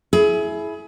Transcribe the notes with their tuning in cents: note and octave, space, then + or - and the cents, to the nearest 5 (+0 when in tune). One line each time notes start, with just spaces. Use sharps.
E4 +0 G#4 +25